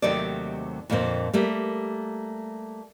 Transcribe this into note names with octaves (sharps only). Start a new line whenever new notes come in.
D#2 C3 F#3 A3 D#4 D5
F2 A#2 D3 A#3 C4
G3 A3 A#3